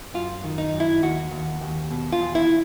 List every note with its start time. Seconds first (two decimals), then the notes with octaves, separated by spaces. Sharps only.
0.14 F#2 F4
0.44 D#3
0.58 D#4
0.73 F#2
0.80 E4
1.02 D#2 F#4
1.31 D#2
1.61 D#2
1.91 B2
2.12 F4
2.20 E2
2.35 E4